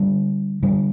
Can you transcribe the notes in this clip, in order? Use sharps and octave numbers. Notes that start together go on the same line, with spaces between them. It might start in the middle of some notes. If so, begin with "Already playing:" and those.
Already playing: D3 G3
D3 G3